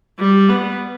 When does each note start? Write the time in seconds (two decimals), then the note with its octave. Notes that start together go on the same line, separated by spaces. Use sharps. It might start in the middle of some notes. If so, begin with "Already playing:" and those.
0.20 G3
0.49 B3